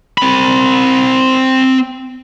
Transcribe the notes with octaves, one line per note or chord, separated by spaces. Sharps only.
C4 B5